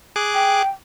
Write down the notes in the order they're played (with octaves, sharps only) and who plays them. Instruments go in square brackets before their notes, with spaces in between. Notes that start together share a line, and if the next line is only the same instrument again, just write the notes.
[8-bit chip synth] G#4 D6 F#6
[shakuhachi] G5